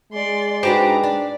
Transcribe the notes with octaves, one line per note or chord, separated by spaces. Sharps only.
G#3 D5 C6
D4 D#4 F#4 G4 B4 C5 A#5
D4 D5